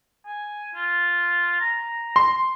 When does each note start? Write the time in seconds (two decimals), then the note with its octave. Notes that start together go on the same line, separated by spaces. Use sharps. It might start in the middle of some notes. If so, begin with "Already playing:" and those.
0.26 G#5
0.75 F4
1.60 A#5
2.16 C6